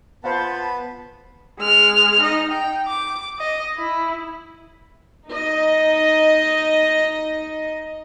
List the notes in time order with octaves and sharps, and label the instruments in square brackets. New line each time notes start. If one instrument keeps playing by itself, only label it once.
[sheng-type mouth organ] B3 B4 [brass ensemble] F4 A5 [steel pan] C5 F5 F#5
[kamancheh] G#3 F6
D#4 D#5
G5
D6
D#5
E4
[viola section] D#4 D#5